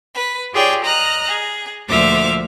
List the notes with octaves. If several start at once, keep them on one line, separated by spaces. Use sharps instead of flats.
B4
F4 G4 G#4 C#5 D5 G5
D#5 A#5 F6 F#6
G#4
D2 A#2 F3 E5 D6 F6